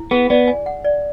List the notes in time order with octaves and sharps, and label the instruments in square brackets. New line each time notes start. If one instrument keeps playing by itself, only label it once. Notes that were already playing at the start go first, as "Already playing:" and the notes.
Already playing: [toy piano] E4
[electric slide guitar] B3 [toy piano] G#4
[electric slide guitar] B3 [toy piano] D5
[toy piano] G#5
F#5
D5